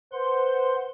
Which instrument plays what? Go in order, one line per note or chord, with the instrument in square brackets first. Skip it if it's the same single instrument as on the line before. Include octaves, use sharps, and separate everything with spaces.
[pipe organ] B4 F#5 C6 [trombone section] C5